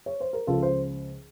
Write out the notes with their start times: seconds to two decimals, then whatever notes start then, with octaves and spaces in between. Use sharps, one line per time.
0.06 C#5
0.20 C5
0.33 A#4
0.47 C#2 C#3 F3 F4 A4
0.62 C5